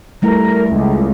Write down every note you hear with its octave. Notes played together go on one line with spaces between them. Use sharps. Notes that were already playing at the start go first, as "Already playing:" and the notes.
G3 A3 E4 A#4
C#2